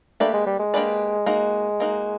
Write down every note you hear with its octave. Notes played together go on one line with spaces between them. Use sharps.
A3 A#3 D4 G4 B4 D5
G#3
G3
G#3
A#3 D4 G4 B4 D5
G#3 A#3 D#4 F#4
A#3 D#4 F#4